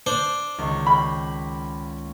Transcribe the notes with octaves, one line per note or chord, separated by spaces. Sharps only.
D4 C5
C#2 D#3 C#6
F5 G5 B5